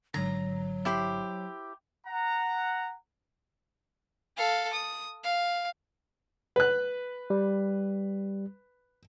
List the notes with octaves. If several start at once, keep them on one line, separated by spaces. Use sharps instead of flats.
G#1 G#2 D3 F#3 A#5
E4 G4 C5
F#5 A#5
A4 F5
D#6
F5
B4 F#6
G3